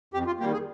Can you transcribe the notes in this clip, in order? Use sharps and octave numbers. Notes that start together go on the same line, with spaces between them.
F2 G4
F4
D#3 G3 A#3 G4
G#4